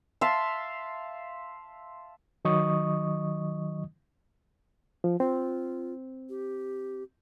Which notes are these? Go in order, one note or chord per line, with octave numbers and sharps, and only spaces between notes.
E5 F5 A5 C6
D#3 F#3 D#5 C#6 D#6
F3
C4 F4
G4